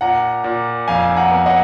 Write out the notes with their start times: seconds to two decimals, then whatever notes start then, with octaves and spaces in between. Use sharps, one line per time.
0.01 A#2 F#5 A#5
0.44 A#2
0.88 F2 F5 G#5
1.16 F#5 A#5
1.31 B3
1.46 D#5 F#5